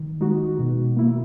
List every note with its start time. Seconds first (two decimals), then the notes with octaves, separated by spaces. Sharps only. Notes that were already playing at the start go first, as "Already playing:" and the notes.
Already playing: D#3
0.21 G#3 D#4 F#4
0.59 B2
0.96 A#3 E4